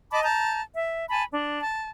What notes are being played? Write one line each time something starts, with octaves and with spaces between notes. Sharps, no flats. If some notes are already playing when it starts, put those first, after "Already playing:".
D#5 A5 B5 D6
A5 A#5 G6
E5
G#5 A5 B5
D4
A5